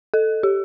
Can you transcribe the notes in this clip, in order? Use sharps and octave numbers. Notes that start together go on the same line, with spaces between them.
A4
G4